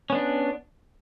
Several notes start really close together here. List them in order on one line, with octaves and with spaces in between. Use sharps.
C#4 B3 D4